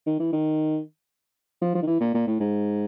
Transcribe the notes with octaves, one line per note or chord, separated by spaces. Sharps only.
D#3
E3
D#3
F3
F3
D#3
E3
A#2
A#2
A2
G#2